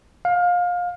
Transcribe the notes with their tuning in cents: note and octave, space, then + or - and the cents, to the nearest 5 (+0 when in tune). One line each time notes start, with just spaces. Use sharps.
F5 +25